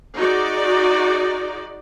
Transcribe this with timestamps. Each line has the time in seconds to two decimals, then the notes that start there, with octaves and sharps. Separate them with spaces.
0.17 D#4 F#4 G#4 D5